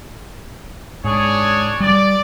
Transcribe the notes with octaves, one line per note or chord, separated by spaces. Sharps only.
G#2 D4 G#4 C#5
G3 D5